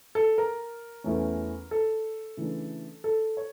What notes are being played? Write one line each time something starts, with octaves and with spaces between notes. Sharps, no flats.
A4
A#4
E2 E3 A3 C#4
A4
C#3 E3 A3 D4
A4
C#5